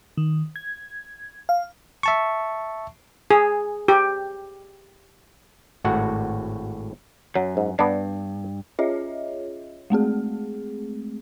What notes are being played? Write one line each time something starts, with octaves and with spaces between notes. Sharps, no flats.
D#3
G#6
F5
E5 A5 C#6
G#4
G4
G#1 A2 F#4 F#5
F#2 F#3
G#2
G2 B3 D4
C#4 F4 G#4 C#5 D#5 E5
G#3 A3 C4 G#4